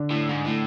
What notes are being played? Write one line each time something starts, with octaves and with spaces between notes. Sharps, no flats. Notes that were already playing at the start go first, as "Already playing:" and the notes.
Already playing: D3 D4
A2
G#2
A2